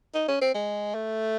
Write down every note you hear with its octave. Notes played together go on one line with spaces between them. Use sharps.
D#4
C#4
C4
G#3
A3